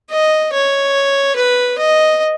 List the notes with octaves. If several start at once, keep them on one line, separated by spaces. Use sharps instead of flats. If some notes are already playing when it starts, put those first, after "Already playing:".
D#5
C#5
B4
D#5